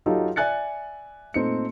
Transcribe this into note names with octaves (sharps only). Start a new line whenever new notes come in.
F#3 D#4 F4 G4 A4
D5 E5 G#5 F#6 A6 C#7
A#2 A3 C4 D#4 C#7